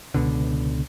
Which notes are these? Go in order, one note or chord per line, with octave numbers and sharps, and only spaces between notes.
C#2 B2 D3